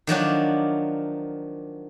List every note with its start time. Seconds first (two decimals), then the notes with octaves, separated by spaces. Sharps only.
0.07 D#3 F3 F#3 D4